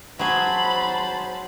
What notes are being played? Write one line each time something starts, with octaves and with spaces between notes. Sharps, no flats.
F#3 G#4 C5 A5 B5